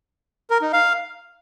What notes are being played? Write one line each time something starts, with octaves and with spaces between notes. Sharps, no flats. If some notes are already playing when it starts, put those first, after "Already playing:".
A#4
D#4
F5